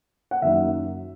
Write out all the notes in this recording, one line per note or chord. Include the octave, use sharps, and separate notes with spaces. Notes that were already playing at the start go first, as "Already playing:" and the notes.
F#5
F#1 F#2 D#3 F#3 E5